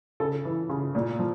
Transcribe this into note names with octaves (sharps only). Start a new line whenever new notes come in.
C#3 A4
E3
C#3
A#2
F3